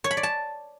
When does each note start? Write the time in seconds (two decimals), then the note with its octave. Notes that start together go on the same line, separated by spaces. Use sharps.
0.04 C#5
0.11 B5
0.17 D5
0.23 A5